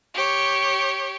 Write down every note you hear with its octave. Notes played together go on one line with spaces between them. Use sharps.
G4 C#5